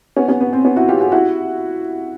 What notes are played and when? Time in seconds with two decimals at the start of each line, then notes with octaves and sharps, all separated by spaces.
0.16 B3 C#4
0.28 B3 C#4
0.41 B3
0.53 C4
0.65 B3 C#4
0.76 E4 F#4
0.88 F4 G4
1.00 F#4 G#4
1.12 E4 F#4